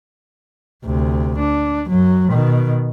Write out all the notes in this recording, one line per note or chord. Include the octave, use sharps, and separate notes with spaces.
D2 C3
D4
F#2 F#3
B2 D#3